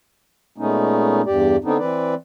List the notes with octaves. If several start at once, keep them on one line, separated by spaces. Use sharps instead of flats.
A#2 G#3 A3 B3 C#4 D#4
E2 G2 G4 D5
D3 B3 C4 D4 D#4
E3 C4 B4 D5